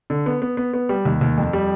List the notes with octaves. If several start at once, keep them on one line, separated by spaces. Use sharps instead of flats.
D3
B3
B3
B3
B3
G3
D#2
D#2
F2
G3